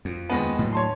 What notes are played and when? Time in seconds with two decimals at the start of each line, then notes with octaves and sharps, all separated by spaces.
0.05 F2
0.29 D#2 G#3 B3
0.59 A2 F#3
0.73 C#5 A5 C6